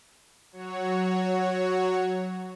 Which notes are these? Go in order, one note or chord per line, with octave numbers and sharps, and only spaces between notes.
F#3 F#4 C#5